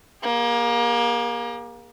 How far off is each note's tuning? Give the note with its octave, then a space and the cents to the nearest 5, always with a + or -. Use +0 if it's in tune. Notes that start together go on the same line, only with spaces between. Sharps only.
A#3 +25 G#4 -35